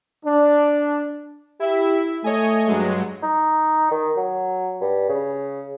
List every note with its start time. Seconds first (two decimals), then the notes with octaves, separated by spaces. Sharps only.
0.25 D4
1.60 E4 G4 E5
2.24 A3 C#5 D#5 G#5
2.67 G2 F#3 G#3
3.23 D#4
3.91 D#3
4.17 F#3
4.81 G2
5.09 C#3